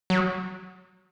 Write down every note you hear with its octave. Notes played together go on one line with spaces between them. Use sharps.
F#3